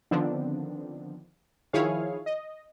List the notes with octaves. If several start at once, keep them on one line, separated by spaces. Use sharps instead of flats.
D3 D#3 F3 B3 C4 D4
D#3 F3 E4 G#4 C#5 F5
D#5